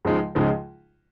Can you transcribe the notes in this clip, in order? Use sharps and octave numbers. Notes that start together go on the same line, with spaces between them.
C#2 C#3 F3 G#3 D#4
C#2 C#3 F3 G#3 D#4